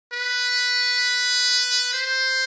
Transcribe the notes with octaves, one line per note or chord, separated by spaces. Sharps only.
B4
C5